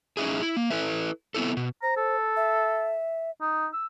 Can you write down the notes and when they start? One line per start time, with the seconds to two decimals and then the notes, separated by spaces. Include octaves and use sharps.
0.17 C#4 D#4 E4 G#4
0.42 E4
0.57 A#3
0.70 E4 A4 B4 E5
1.34 B3 C4 E4 A4
1.57 B2
1.83 C5 A#5
1.97 A4
2.36 E5
3.41 D#4
3.73 E6